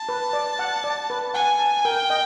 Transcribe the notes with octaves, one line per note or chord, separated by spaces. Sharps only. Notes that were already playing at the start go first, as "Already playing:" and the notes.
Already playing: A5
B4
D5
F#5
D5
B4
F#5 G#5
A5
A#4 G5
D#5